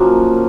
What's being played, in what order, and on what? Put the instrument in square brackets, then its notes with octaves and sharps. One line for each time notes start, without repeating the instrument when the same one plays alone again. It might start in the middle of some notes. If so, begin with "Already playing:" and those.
Already playing: [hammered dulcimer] F#2 F3 A#3